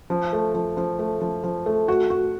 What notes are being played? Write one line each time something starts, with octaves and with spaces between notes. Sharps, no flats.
F3
A3
F3
F3
A3
F3
F3
A3
F#4
F#4